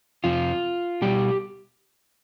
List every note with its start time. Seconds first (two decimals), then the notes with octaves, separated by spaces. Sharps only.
0.24 F2 C3 F3 F4
1.02 B2 G3 G4